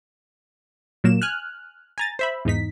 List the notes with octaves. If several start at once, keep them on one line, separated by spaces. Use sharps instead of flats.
A#2 F#3 A#3 E7
G#5 F6 F#6
G#5 A#5 A6
C5 E5 B5
E2 G#2 D#4 B6